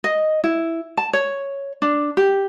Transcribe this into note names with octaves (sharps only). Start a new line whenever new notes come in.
D#5
E4
A5
C#5
D4
G4